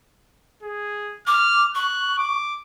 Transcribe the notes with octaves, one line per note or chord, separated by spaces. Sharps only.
G#4
D6 F6
C#6 F#6
D6